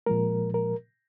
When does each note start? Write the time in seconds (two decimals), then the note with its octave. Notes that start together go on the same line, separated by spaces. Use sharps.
0.06 A#2 F3 G#3 A#4
0.54 A#4